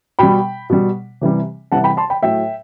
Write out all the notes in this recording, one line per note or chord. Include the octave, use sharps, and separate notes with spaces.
B2 G3 G5 B5
B2 G3
C3 E3 G3
C3 E3 G3 F#5 A5
G5 B5
A5 C6
G5 B5
A2 F#3 E5 G5